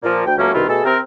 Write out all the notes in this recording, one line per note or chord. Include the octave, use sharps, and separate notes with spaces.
A#2 F3 A#3
D2 G5
C#2 F#3 A3 A#3 C#4
C2 B2 D#3 E4 F4
B2 A3 G#4 A4
C3 C4 A#4